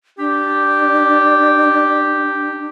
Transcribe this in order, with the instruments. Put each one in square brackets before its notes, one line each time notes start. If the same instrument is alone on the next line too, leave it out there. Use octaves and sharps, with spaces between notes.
[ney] D4 [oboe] G4